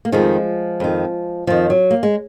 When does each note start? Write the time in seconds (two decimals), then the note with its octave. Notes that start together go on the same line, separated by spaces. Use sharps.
0.05 A#3
0.12 F2 D#3 F3 G#3
0.80 F2 D#3
1.47 F2 D#3 F3
1.70 F#3
1.91 A#3
2.03 G#3